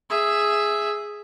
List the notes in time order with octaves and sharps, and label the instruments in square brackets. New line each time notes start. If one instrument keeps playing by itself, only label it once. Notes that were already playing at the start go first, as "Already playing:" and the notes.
[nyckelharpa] G#4 E5